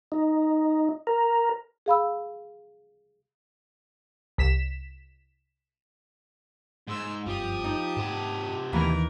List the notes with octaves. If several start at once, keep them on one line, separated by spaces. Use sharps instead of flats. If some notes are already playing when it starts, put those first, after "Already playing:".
D#4
A#4
G#4 F5 B5 E6
C2 B6 E7
G#2 C6 E6
F#1 G2 F3 C4 G4 D#6
D#4
G#2 C3 A5
D#2 D#3 E3 A#3 A#4 B4